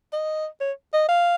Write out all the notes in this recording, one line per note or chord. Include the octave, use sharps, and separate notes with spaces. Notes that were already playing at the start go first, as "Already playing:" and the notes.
D#5
C#5
D#5
F5